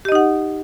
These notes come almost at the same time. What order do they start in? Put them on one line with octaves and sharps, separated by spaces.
G4 D#5 D#4 F#5